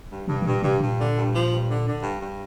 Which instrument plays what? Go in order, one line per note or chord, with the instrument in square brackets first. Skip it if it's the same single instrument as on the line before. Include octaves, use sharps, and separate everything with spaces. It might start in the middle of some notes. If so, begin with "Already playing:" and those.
[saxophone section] G2
[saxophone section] G2 [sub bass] C3
[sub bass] C3
[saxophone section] G2 [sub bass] A#2
[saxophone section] G2 [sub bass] C3
[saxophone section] G2 [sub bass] A#2
[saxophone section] D3
G2
F3
G2
D3
D3
G2
G2